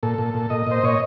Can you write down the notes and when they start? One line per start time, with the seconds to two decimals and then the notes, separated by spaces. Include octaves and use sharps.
0.03 A#2 A4
0.18 A#2
0.34 A#2
0.50 A#2 D#5
0.67 A#2 C5
0.83 A#2 C#5